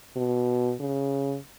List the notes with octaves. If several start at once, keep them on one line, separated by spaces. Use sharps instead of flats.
B2
C#3